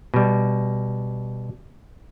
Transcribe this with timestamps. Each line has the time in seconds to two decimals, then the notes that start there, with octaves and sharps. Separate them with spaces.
0.14 B2 G3